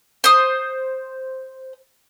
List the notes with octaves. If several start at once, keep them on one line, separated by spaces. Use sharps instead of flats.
C5 D#6